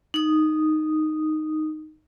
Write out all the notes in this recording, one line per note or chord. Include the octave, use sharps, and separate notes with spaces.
D#4 D#6